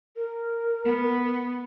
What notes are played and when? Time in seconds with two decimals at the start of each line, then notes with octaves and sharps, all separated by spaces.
0.16 A#4
0.84 B3